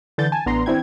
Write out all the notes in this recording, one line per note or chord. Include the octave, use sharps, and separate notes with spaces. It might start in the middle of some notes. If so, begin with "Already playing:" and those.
D3 E3 G6 A6
G#5 A5
A1 B3 D4 A#5 C6
E3 C4 D4 E4 G5 G#6